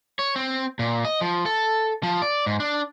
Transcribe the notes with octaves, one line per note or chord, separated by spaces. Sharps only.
C#5
C4
A#2
D#5
F3
A4
F3
D5
G#2
D4